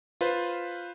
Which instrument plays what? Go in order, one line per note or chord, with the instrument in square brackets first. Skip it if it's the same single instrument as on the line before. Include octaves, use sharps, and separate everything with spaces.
[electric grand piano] F4 B4 C5